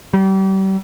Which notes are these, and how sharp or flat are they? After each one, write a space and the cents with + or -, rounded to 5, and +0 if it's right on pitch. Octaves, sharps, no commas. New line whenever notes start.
G3 -35